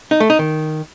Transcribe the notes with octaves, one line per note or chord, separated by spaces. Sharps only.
D#4
A3
D#4
D#3